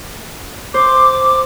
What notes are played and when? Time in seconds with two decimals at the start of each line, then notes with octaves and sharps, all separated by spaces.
0.74 C5 D6